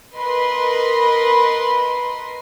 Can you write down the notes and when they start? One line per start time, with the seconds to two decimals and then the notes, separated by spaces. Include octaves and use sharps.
0.17 A#4 B4 D#5 B5 C6